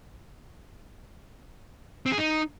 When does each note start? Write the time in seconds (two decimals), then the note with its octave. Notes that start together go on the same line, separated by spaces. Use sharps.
2.06 C4
2.12 G#4
2.18 D#4